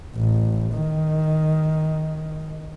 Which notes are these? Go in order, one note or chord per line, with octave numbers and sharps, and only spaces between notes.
A1
D#3